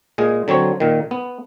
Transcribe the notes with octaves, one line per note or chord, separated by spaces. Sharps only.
A#2 G#3 G#4
D3 F#3 C4 C#5
A#2 D#3
B3